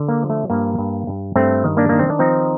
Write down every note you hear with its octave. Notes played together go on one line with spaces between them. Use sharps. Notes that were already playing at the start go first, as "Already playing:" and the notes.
Already playing: D3
A#3
F3
A3
G2 A#3
G2
G2
G2 A3 C4
D#3
A#3 D4
D#3 A#3
C4
D4
F3 C4 D#4